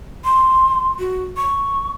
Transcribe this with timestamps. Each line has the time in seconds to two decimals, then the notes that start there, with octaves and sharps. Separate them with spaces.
0.24 C6
0.99 F#4
1.37 C#6